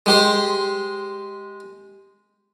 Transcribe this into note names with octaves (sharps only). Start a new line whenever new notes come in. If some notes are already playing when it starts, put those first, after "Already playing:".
G#3 G4 C5